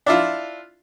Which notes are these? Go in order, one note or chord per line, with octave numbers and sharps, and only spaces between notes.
D4 E4 F4